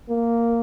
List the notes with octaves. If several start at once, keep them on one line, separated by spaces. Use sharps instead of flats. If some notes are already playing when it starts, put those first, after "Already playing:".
A#3